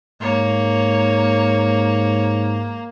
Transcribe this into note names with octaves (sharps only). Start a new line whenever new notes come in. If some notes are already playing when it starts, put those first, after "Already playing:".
G#2 A#3 C#5